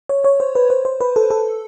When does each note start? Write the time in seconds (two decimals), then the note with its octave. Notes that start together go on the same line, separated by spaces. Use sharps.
0.09 C#5
0.24 C#5
0.40 C5
0.55 B4
0.70 C5
0.85 C5
1.01 B4
1.16 A4
1.31 A4